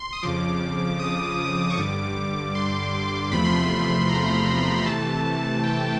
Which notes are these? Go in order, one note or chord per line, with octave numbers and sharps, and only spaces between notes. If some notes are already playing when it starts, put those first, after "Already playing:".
Already playing: C6
D#6
F2 C#3 F3 D6
D#6
C#6
G2 D3 G3 D6
C6
E2 C3 F3 A3 B5
C6
B5
A#5
C3 E3 A3 A5
G5